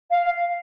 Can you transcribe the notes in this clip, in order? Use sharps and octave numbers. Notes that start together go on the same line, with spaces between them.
F5